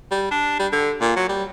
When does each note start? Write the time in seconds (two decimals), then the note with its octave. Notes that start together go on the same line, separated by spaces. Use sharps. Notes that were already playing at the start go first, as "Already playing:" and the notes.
0.11 G3
0.31 D4
0.59 G3
0.73 D3
1.01 A#2
1.16 F#3
1.29 G3